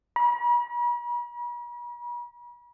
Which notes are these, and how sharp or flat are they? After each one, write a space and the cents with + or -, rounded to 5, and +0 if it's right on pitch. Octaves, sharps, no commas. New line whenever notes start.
B5 -45